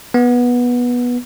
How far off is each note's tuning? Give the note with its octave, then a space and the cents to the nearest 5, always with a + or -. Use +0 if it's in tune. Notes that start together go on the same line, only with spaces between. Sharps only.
B3 -15